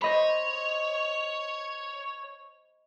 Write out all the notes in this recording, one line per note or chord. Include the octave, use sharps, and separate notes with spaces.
C5 C#5 D#5 B5